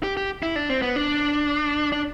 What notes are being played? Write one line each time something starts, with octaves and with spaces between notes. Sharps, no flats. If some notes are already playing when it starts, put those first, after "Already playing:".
G4
G4
E4
D4
C4
B3
D4
D4